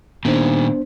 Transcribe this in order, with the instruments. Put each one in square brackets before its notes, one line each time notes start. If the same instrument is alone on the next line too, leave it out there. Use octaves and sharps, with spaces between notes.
[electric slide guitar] A#2 D#3 [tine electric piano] B3 D4 C5